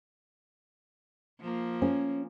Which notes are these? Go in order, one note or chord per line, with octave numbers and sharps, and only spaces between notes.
F3 A#3
C#4